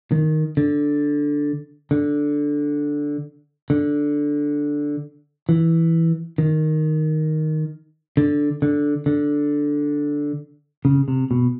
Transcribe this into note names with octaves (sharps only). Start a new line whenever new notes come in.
D#3
D3
D3
D3
E3
D#3
D3
D3
D3
C#3
C3
B2